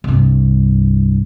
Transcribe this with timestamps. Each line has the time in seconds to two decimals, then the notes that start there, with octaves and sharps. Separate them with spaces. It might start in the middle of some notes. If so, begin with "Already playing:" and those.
0.04 C2 G2